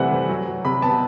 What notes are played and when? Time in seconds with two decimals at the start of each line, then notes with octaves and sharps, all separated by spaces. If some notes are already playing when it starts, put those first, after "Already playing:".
Already playing: C3 E3 G3 A3 B4 C5 E5 F#5
0.11 E3
0.29 F#3
0.47 F#3
0.65 C3 B5
0.82 B3 A5